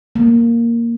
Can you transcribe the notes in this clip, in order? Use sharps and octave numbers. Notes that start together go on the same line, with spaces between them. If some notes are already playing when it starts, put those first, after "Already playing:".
A#3